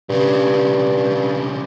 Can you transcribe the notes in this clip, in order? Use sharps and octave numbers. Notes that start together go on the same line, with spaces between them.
B1 G2 C#3